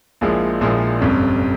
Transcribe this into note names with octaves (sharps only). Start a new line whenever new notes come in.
A#1 A#2 F3 G#3 E4
A#1 A#2 F3 G#3 E4
G1 F2 C3 G3 C#4